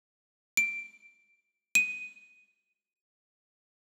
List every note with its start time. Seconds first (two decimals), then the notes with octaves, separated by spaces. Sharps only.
0.57 D7
1.75 D#7